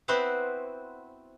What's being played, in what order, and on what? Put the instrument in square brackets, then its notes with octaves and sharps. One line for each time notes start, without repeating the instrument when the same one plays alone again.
[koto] B3 C4 E4 F#4 B4 C5